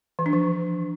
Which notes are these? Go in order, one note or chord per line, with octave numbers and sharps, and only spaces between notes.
E3
D4
F3